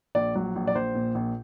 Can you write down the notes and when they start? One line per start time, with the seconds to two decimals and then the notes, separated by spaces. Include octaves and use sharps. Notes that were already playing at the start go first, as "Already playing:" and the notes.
0.15 A#1 D5
0.35 F#3
0.56 A#1
0.67 D5
0.75 A#1 C5
0.95 A#2
1.15 A#1